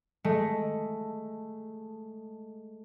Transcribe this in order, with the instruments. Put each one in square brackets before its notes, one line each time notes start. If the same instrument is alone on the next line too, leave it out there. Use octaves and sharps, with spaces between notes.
[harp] G#3 A3